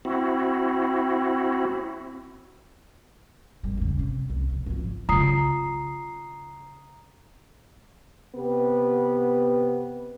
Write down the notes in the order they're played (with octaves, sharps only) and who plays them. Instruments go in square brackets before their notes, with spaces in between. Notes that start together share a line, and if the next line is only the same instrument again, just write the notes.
[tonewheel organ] C4 E4 F#4
[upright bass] G#1 G3
E2 C#3
C3
C2 E3
B2
G#1 F3
[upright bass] C#3 F4 [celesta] A#5 D#6 C7
[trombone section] C3 B3 G4 B4